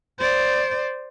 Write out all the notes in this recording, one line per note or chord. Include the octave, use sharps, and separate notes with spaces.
C5 D5